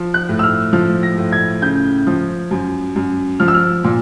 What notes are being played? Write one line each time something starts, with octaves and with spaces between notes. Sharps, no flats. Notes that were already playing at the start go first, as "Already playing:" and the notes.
Already playing: F3
F#6
A2
E6
F6
F3 F6
A#6
A2
G#6
C#3 G6
F3
F#2
F#2
F3 F6
E6
F6
A#2